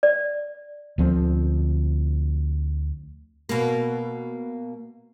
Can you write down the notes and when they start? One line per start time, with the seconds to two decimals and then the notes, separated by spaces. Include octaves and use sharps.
0.03 D5
0.98 D2 F3 C4
3.49 B2 A#3